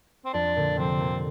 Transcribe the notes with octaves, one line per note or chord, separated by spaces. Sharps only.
C4
F2 D4
A#2 D3
C3 F3 C4
A#2 D3